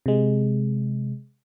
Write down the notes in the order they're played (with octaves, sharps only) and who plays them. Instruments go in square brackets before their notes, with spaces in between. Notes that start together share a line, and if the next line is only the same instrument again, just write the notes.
[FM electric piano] C3 G#3